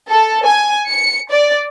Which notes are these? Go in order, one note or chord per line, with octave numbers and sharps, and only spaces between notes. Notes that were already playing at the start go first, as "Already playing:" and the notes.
A4
G#5
C#7
D5